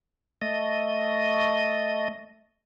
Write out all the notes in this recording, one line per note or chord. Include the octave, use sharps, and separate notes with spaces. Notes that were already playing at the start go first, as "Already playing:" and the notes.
A3 D#5